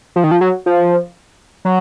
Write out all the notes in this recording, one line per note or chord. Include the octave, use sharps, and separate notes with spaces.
F3
D#3
F3
F#3
F3
F#3